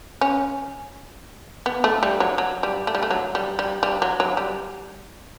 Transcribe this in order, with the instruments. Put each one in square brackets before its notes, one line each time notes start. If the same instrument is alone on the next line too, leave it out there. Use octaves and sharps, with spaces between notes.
[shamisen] C#4
B3
A3
G3
F#3
F#3
G3
A3
G3
A3
F#3
G3
G3
G3
F#3
F#3
G3